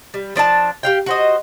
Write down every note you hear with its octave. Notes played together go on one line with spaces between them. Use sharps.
G3
F3 D4 E5 A5
G4 F5 G5
F#4 C5 D#5